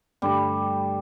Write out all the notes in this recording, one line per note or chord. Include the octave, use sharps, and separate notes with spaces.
G2 D3 G3 A3